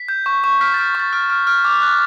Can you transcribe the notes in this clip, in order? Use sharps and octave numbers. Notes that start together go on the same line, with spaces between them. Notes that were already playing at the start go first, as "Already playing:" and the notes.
Already playing: B6
G6
C#6
C#6
F6 B6
F6 A6
C#6 A6
F6
F6
F6
D6
F#6